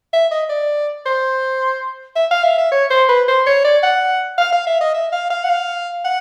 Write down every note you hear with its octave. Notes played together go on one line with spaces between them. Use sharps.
E5
D#5
D5
C5
E5
F5
E5
E5
C#5
C5
B4
C5
C#5
D5
F#5
F5
F5
E5
D#5
E5
F5
F5
F#5
F5
F#5